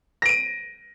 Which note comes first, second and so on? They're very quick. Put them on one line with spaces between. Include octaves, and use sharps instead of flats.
A#6 D7 D#7